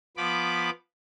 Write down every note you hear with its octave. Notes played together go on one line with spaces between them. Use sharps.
F3 B3 B5 D6